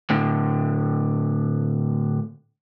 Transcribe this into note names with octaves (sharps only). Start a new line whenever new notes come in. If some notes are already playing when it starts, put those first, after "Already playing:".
A2 D3